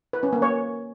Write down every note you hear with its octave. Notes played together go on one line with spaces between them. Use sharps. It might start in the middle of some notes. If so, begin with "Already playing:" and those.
B4
C#4
A#3
C#5